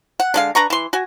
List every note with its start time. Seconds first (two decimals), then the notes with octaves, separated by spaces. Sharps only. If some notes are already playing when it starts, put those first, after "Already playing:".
0.20 F#5
0.34 D3 G#3 F5
0.55 D4 B4 A#5 C#6
0.70 E3 C6
0.93 F#4 G#5